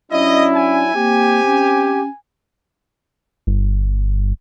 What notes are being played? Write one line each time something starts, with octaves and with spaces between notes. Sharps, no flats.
F#3 C#4 D4 E4 D#5
G#5
A#3 C4 G4
C#4
G1